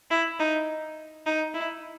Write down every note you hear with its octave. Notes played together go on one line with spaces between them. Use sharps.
E4
D#4
D#4
E4